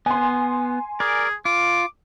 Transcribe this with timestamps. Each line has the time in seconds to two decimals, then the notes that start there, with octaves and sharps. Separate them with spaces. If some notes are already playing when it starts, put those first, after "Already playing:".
0.06 B3 G#5 C6
1.00 G#4 A#4 D5
1.45 F4 D6